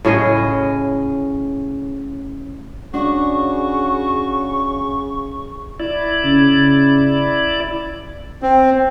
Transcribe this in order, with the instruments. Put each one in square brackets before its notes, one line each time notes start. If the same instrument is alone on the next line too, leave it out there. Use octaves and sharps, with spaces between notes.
[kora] A2 C#3 G#4 D#5
[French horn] C#3 [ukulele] D4 [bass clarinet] F#4 [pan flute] C#6
[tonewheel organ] E4 D5
[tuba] C#3
[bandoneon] C4